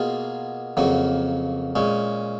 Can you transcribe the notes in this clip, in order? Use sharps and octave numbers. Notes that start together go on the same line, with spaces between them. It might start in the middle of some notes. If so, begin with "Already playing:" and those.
Already playing: B2 A#3 F4 G#4
F2 C#3 F#3 A#3
A#2 G#3 C#4